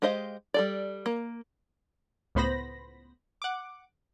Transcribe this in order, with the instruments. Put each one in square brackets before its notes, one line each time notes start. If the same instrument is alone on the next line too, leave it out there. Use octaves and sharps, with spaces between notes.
[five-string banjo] G#3 G4 C5 D#5 F5
G3 A4 D5
A#3
[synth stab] C#2 A2 B3 C5 B5 A#6
F#5 D6